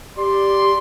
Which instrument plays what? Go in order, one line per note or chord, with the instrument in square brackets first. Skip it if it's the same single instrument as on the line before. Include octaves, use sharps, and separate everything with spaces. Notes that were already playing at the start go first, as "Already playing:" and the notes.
[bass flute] G4 [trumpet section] D5 C6